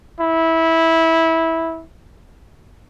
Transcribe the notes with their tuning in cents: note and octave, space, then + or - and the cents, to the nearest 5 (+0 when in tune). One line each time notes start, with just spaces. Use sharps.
E4 -15